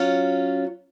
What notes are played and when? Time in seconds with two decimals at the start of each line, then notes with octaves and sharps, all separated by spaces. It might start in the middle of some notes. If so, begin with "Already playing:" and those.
Already playing: F#3 C#4 F4